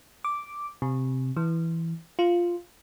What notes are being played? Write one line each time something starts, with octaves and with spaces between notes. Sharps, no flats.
D6
C3
E3
F4